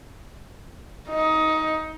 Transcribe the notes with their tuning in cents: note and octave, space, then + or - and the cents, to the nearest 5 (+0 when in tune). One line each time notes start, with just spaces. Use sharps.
D#4 +15